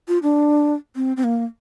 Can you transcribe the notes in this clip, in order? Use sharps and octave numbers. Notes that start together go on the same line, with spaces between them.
F4
D4
C4
C4
A#3